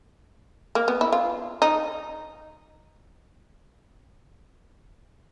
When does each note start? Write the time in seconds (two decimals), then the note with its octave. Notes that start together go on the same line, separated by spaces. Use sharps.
0.75 A#3
0.88 B3
1.01 E4
1.12 F4
1.62 D#4